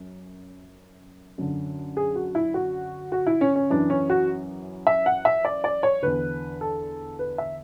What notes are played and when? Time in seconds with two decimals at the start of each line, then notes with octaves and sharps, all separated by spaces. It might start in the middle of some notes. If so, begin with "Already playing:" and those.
Already playing: F#2
1.38 F#2 D3
1.97 G#4
2.16 F#4
2.35 E4
2.54 F#4
3.12 F#4
3.27 E4
3.41 C#4
3.56 C#4
3.70 F#2 E3 D4
3.90 C#4
4.10 F#4
4.87 E5
5.06 F#5
5.25 E5
5.45 D5
5.64 D5
5.83 C#5
6.02 E2 D3 B4
6.61 A4
7.19 B4
7.38 E5